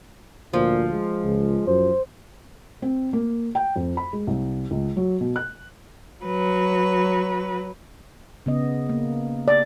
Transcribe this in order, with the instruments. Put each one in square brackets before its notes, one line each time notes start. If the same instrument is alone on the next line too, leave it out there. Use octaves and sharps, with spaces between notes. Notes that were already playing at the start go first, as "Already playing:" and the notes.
[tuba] D2 [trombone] A#2 [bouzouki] F3
[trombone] G#3
[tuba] C#2
[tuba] F#2 [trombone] C5
[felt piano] C4
A#3
G5
F2
B5
G#3
C2
C#2
F#3
B2
F#6
[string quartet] F#3 B4
[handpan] C#3 B3 D#5
A#3
[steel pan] D5